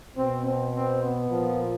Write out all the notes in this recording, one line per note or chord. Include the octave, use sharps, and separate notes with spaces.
B2 C4
C4
C4
B3
A#2 F3